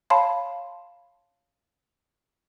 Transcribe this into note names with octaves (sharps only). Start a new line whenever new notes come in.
C#5 F5 A5 B5 C6